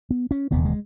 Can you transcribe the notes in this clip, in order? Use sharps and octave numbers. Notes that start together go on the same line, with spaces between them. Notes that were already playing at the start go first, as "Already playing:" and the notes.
B3
C#4
E1 D#2 C#3 B3
G#3